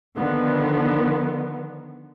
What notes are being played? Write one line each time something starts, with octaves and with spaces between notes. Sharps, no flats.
D3 D#3 F3 B3